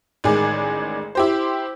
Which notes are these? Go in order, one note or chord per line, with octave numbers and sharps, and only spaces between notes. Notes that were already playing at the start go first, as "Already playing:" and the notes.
A1 D#3 G#3 G#4 D5
E4 G4 C5